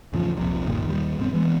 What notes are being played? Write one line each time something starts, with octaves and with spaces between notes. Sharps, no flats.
E2 A2 C#3 F3
D#1 A#1 F2 C3
D1 G1 A#2 D#3
D#2 D#3 G3
F1 G#2 B3 C4
E3 G#3 B3